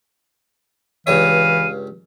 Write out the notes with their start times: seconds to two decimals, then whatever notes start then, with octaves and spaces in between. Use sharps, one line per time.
1.07 C#2 G2 E3 C#5 F5 D#7